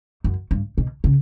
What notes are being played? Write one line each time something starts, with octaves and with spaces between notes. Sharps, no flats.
F#2
G2
B2
C#3